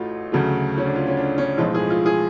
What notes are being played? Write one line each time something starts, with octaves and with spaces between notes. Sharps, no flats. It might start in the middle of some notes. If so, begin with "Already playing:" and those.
Already playing: A1 A2 A3 F4 F#4
D2 C#3 F#3 A3
C#4
D4
F4
C#4
D4
C#4
B1 A2 F3 G#3 F4
G#4
F4
G#4